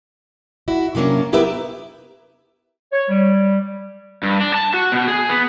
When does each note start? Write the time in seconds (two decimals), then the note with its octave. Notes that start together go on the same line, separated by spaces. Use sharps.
0.68 E4 F#4
0.95 C3 F#3 A#3 C#4 D4
1.32 B3 E4 G4 A#4 B4 E5
2.91 C#5
3.09 G3
4.23 G2
4.41 D4
4.54 A5
4.74 F#4
4.92 B2
5.08 G#4
5.29 B3